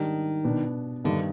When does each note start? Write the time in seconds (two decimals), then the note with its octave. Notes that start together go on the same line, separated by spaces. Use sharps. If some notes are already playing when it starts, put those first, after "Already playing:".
Already playing: G#2 D#3 G3 D4 G4
0.45 B2 B3 D4
1.04 G2 D3 D#3 B3 D#4